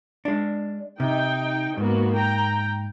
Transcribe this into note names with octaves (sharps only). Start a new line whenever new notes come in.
G#3 D4
C3 D#4 G5
G#2 A#3 B3 F#4
G5 A#5